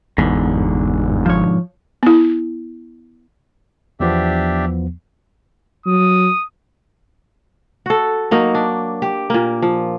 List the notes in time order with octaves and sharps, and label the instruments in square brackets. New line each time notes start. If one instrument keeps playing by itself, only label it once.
[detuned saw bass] G1 [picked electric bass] E2 [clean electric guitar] G#2 B2 D3
[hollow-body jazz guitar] F3 C#5
[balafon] B3 E4
[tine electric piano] E2 F3 B3 [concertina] D4 G4 E5
[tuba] F#3 [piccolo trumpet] D#6
[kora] F#4 A4
F#3 A#3 D#4
D4
G4
A#2 A#3
F3